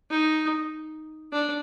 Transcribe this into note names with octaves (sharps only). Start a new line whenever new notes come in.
D#4
D4